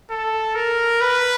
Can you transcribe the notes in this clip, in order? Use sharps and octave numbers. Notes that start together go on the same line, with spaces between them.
A4
A#4
B4